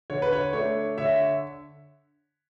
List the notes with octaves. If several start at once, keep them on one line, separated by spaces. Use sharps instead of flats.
D3 C#5
B4
C#5
A3 D4 C#5
D3 C#5 E5